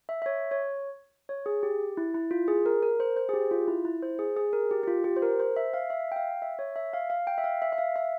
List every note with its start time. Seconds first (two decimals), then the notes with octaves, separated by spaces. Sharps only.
0.09 E5
0.22 E5
0.26 C#5
0.51 C#5
1.29 C#5
1.46 G#4
1.63 G4
1.97 E4
2.14 E4
2.31 F4
2.48 G#4
2.66 A#4
2.83 A#4
3.00 C5
3.16 C5
3.29 G#4
3.33 G4
3.51 F4
3.68 E4
3.85 E4
4.02 C5
4.19 G#4
4.37 G#4
4.53 A#4
4.71 G4
4.83 G4
4.88 F4
5.04 G4
5.16 C5
5.22 A#4
5.39 C5
5.56 E5
5.74 F5
5.90 E5
6.12 G5
6.16 F5
6.42 E5
6.59 C#5
6.76 E5
6.93 F5
7.10 F5
7.27 G5
7.38 E5
7.44 F5
7.62 E5
7.72 E5
7.78 F5
7.96 E5